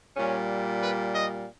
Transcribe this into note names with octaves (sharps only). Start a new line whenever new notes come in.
A#2 G3 C#4
B4
D#5